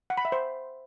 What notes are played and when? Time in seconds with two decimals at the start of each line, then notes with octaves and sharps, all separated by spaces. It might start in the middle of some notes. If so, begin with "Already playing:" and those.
0.10 F#5
0.17 B5
0.25 E5
0.32 C5